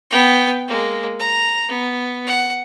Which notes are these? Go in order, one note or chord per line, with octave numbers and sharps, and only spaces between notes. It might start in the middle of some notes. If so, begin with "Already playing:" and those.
B3 G5
G#3 A#3
A#5
B3
F#5